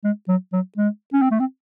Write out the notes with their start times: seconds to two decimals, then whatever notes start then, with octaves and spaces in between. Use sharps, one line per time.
0.04 G#3
0.28 F#3
0.53 F#3
0.77 G#3
1.13 C#4
1.22 C4
1.31 A3
1.40 C4